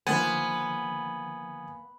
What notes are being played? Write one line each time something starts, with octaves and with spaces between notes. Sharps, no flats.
D3 D#3 F3 A#3 B3 C5 G#5